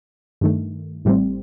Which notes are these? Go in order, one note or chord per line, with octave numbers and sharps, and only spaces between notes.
G2 D#3 A3
A1 A2 G3 C4